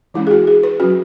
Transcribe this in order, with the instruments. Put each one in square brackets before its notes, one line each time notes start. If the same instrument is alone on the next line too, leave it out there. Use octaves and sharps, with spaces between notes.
[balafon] E3 G#3 C#4 E4
G#4
F#4
G#4
B4
F#3 C#4 F#4